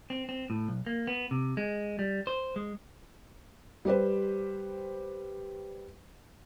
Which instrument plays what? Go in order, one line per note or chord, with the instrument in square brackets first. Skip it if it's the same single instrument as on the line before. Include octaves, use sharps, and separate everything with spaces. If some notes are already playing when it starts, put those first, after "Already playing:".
[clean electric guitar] C4
C4
A2
B1
A#3
B3
C3
G#3
G3
C5
G#3
[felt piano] G3 G4 B4 C5